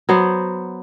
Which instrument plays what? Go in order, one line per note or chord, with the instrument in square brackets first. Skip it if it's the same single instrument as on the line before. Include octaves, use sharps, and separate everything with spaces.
[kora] F#3 B3 C5